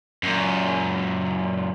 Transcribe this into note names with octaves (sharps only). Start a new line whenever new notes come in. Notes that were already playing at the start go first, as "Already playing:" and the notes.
F#2 A#2